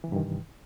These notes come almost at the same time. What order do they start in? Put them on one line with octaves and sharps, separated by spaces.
E3 C3 G2 D#3